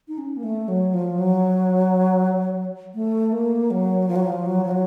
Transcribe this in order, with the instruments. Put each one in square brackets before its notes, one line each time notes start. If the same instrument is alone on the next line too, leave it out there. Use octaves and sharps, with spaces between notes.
[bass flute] D#4
C#4
A#3
A3
F#3
F3
F#3
A3
A#3
F#3
F3
F#3
F3
F#3
F3
F#3